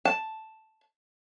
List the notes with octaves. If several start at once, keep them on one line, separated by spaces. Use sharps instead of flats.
A5